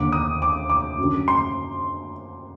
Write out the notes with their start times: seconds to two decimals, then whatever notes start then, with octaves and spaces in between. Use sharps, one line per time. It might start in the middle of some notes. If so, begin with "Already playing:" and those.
Already playing: D#2 D3 D6
0.12 D#6
0.42 D6
0.70 D6
0.98 F#2
1.03 D3
1.28 C6